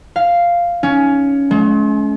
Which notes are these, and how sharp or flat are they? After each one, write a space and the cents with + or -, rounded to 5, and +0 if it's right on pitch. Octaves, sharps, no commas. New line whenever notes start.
F5 -5
C#4 +15
G#3 +45